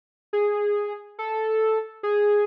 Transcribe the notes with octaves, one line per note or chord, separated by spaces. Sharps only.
G#4
A4
G#4